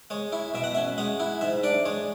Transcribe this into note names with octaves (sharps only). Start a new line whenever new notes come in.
G#3 C#5
E4
B2 E5
F#5
C#4 E5
G#3 F#5
E4
G#2 E5
D4 D5
G#3 C#5